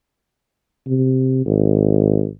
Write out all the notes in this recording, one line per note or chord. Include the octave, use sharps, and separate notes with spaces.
C3
G#1